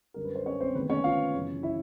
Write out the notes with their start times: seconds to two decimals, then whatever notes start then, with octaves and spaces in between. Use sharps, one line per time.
0.14 F#2 D3 G3 A#4
0.24 B4
0.36 C5
0.46 C#4 C#5
0.61 C4 C5
0.75 D2 C3 D#3 G#3 B3 B4
0.90 C#4 C#5
1.04 F4 F5
1.34 F#2 C#3 E3
1.63 E4 E5